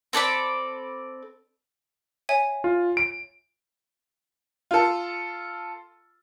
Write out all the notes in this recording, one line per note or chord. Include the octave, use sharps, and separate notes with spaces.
C4 A4 D5 B5
C#5 E5 G#5
F4
D7
F4 A4